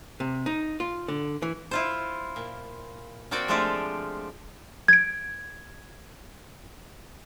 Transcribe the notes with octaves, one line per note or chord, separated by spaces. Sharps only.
C3
D#4
F4
D3
E3
E4 F4 C5
A#2
A#3 C4 F#4 D5 G5
F3 G#3 A3 D4 F4 G4
G#6 D7